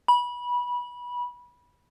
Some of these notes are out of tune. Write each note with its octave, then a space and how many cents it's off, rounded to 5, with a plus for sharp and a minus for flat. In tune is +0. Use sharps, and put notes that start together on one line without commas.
B5 -20